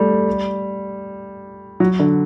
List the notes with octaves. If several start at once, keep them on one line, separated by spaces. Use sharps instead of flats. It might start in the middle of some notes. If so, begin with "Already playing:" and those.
Already playing: G3 A3
F#3
D3